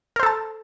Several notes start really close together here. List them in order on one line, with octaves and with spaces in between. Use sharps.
A#4 C5 A4 A5